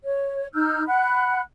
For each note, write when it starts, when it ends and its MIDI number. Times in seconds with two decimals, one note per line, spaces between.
0.04 0.47 73
0.54 0.83 63
0.54 0.83 88
0.54 0.83 89
0.54 0.83 91
0.86 1.40 78
0.86 1.40 83
0.86 1.40 90